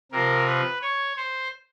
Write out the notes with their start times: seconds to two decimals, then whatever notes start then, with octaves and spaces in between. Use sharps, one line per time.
0.11 C3 F3 A#4
0.47 B4
0.82 C#5
1.16 C5